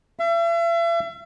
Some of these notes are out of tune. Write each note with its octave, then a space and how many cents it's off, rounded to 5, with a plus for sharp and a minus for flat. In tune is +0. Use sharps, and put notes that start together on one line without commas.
E5 +40